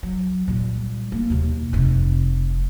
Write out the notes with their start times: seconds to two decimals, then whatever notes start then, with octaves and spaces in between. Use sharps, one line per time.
0.03 F#3
0.48 A#2 G3
1.12 A#3
1.30 D#2 B2
1.73 F1 C3